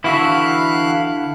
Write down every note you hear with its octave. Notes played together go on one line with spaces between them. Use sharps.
D3 E3 E4 F#4 E5 F5 F#6